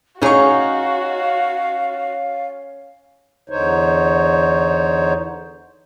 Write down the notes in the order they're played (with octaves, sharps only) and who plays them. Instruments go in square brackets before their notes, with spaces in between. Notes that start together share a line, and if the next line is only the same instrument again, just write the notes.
[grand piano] C#4 C#6 [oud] D#4 G#4 [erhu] F#4 [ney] F5
[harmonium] E2 D3 D#4 C5 C#5